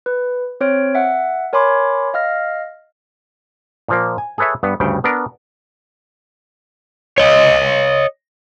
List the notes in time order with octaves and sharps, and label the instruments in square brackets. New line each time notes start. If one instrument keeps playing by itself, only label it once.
[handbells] B4
C4 C5 C#5 F6 D7
E5 F#5
A#4 C#5 G#5 B5 C6 D6
D#5 F5 F6 A#6
[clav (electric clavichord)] A#2 F3 A#3
G#5
G#4 A4 B4 C#5 E5
G2 B3
D2 G2 C#3 G5
B3 D4 A#4 D5
[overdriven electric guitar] C#5 D#5